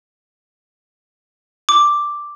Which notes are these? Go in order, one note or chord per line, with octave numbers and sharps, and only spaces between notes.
D6